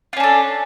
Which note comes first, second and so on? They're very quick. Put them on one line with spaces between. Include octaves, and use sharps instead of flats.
F4 C#4 D4 A4